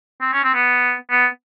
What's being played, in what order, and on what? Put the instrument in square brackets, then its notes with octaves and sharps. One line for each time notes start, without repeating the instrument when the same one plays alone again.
[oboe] C4
C#4
C4
B3
B3